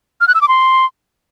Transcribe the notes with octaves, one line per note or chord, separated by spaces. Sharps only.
F6
F#6
E6
D6
C6